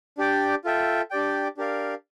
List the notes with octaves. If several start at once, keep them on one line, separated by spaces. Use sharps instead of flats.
D4 G4 D5 G5
F4 A4 E5 G5
D4 G4 D5 G5
D4 G4 A#4 D5 F5